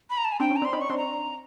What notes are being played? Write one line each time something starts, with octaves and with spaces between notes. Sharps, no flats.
B5
A#5
A5
G#5
C4 D4 G5
C#4
A#5
C4 D4 C6
C#4 D#4 B5
C#6
C4 D4 C6
A#5